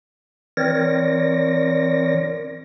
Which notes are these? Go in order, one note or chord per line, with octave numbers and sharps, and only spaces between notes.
E3 C4 A#4 C#5 D5 A#6